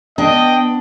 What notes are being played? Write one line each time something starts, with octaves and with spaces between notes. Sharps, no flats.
B3 D4 D#5 G5